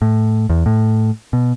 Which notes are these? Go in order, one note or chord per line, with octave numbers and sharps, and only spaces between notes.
A2
E2
A2
B2